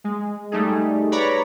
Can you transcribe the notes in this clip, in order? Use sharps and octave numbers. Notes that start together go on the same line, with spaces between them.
G#3
G3 A3 D#4 G#4
B4 C#5 D5 A#5 B5